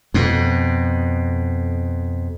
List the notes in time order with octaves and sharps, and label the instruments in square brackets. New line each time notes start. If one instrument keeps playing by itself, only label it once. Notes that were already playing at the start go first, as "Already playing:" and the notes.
[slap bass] F2 B2